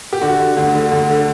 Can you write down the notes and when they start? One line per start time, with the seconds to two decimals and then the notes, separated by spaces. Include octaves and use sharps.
0.13 G4
0.21 D3 F#4
0.39 D3
0.57 D2
0.74 D3
0.91 D2
1.09 D3